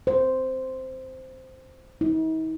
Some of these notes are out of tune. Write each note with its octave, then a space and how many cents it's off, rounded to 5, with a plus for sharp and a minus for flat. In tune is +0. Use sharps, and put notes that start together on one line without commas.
C5 -5
D#4 +45